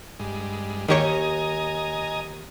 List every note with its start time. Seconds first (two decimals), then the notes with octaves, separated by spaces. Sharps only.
0.19 G2 G#3
0.89 D#2 D#3 G4 C#5 D#5 G#5 A#5